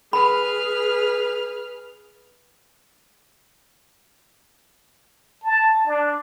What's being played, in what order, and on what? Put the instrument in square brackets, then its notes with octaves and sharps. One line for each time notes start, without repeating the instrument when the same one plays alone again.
[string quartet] G#4 B4 F6 [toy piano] B5
[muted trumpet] A5
D4